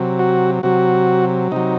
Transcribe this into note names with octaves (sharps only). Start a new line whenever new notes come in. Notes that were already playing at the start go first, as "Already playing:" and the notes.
Already playing: C3 F#3
F#4
C3 F#3 F#4
C3 F#3 D#4